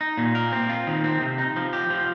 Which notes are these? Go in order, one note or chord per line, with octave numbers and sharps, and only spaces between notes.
D#4
A#2
A#4
C4
F4
D#3
C4
C3
D#4
F3
G4
F3